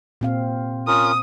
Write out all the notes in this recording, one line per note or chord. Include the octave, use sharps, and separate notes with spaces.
A#2 C4 F5
C#4 F4 A#4 D#6